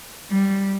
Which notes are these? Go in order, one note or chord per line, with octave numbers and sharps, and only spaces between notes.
G3